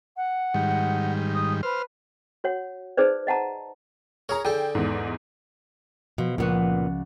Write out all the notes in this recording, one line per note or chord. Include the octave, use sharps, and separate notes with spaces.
F#5
G#2 D#3 G3
D#6
B4 C5 F6
F#4 C#5 F#5
D#4 G#4 B4 C5 D5
D#5 F#5 A5 A#5
G#4 A#4 C#5 A#5
D3 G#4 A4 G5
E2 G#2
B2 F3
C#2 A#2 B3 F#4